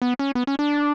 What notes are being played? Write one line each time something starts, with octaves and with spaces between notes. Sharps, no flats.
B3
C#4
B3
C#4
D4